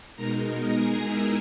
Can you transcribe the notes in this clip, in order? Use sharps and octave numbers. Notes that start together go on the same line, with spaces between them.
B2 G#3 D#4 A#4 A#5
A#4 A#5
G#4 G#5
E4 E5